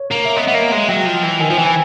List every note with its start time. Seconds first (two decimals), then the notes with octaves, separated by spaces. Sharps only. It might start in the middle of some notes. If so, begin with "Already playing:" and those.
Already playing: C#5
0.11 A#3
0.25 E5
0.36 B3 D#5
0.47 B3
0.54 A#3
0.71 G#3
0.88 F#3 G5
1.06 F3
1.23 E3
1.40 D#3 G#5
1.50 F3
1.58 E3
1.66 G#5